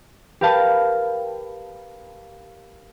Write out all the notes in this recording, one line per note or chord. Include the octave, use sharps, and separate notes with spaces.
G4 A#4 B4 F5 A5